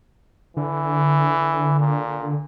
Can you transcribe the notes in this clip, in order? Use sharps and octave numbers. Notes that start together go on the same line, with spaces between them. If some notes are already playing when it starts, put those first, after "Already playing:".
D3 E3
A#2